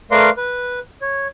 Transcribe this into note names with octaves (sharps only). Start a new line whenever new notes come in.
A3 A#4 B4 D5 F5 C6
B4
C#5